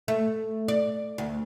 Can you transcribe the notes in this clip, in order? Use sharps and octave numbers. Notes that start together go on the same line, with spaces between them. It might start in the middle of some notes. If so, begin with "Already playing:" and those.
A3
D5
D2